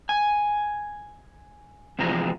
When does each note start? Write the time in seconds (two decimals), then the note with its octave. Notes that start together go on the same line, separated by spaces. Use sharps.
0.09 G#5
1.99 E2 C3 F3 G#3 A#5